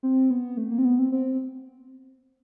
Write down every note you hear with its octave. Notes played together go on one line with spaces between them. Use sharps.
C4
B3
A3
A#3
C4
B3
C4
C4